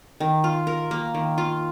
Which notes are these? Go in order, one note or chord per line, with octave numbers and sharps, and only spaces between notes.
D#3
F4
A#4
A#3
D#3
F4